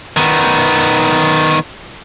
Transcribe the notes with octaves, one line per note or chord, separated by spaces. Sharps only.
D#3 B3